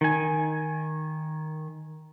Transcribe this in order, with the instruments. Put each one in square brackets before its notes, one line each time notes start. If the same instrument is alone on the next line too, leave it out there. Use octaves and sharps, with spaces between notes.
[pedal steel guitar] D#3 G#5